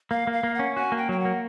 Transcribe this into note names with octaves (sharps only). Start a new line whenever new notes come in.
A#3 F5
A#3
F5
A#3
C#4 F#5
F#4 G#5
A#3
G5
F#3 G5
F#5
A#3